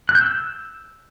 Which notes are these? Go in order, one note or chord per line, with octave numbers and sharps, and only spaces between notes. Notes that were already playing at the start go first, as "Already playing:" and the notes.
F#6
G6
E6